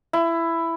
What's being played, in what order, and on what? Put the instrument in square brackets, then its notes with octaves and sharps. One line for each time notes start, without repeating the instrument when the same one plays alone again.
[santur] E4